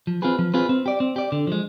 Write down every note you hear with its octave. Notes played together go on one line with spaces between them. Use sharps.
F3
C4 F4 G#4 B4
F3
C4 F4 G#4 B4
C4
G4 D5
C4
G4 D5
D3
F3 G#3